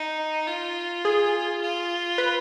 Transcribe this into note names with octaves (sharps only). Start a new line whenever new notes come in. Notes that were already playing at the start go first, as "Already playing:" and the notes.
Already playing: D#4
F4
G#4
F4
B4